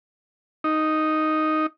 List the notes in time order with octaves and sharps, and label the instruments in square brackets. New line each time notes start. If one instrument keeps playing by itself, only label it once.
[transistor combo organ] D#4